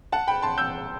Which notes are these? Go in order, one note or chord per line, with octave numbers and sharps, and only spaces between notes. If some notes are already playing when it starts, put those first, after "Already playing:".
F#5 A5
G5 B5
A5 C6
E6 G6